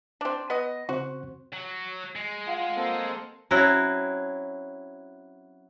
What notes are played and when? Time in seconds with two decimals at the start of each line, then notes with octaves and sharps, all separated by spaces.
0.21 C4 D4
0.50 B3 D#5
0.89 C#3 C4 F#4 C5
1.53 F#3
2.16 G#3
2.48 F4 F#5
2.76 A#3 C4 A4
3.51 F#3 C4 C#4 E4 F#4 E5